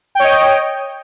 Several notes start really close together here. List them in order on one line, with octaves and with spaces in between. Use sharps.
G5 C#5 D#5